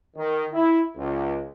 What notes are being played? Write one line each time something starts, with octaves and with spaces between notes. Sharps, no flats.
D#3
E4
C#2